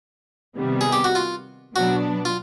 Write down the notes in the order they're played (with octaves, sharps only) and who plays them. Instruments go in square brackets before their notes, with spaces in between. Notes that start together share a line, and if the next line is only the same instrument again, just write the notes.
[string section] C3 D#3 G3 B3
[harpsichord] G#4
G4
F#4
F4
[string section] B2 F#3 B3 D4 [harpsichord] F#4
[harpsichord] F4